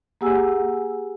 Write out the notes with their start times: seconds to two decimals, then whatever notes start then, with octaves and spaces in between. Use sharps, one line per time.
0.21 A#3 G4 G#4 F#5 G#5 E6